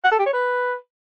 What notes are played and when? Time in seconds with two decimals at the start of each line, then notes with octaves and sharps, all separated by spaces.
0.04 F#5
0.11 A4
0.19 G4
0.26 C#5
0.33 B4